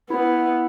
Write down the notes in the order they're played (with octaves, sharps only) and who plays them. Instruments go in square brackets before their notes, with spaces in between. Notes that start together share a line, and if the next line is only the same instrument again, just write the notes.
[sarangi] B3 [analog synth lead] E4